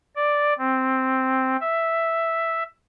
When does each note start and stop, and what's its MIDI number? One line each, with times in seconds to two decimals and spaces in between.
0.16 0.54 74
0.59 1.57 60
1.61 2.63 76